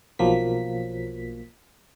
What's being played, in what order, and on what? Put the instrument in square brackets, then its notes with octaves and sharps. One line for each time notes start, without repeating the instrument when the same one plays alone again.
[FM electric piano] B1 F3 F#3 A#3 B6